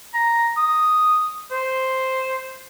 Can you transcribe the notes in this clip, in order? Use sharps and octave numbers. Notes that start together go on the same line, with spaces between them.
A#5
D#6
C5